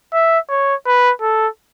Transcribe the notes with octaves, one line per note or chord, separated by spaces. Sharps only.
E5
C#5
B4
A4